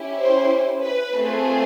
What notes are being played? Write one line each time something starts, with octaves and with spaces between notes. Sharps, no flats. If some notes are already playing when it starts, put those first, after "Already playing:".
Already playing: C#4 E4 G4
C5
B4
A3 C4 F4 G#4